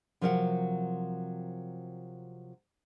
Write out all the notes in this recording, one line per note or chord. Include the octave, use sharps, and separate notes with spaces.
C3 F3 F#3 A#4 B4 F#5